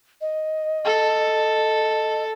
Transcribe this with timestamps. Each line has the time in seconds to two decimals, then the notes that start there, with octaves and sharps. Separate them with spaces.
0.21 D#5
0.85 A4